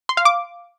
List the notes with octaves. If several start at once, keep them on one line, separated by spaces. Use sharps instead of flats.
C6
F5
D6